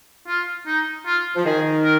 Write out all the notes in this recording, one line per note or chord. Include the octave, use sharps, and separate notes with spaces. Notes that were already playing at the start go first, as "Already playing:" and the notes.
F4
D#4
F4
F3
D#3 G#4
A#4